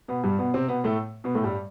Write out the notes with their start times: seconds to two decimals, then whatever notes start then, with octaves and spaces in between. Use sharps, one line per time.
0.08 B2 B3
0.24 G2 G3
0.39 B2 B3
0.54 C3 C4
0.68 B2 B3
0.84 A2 A3
1.24 B2 B3
1.35 A2 A3
1.44 G2 G3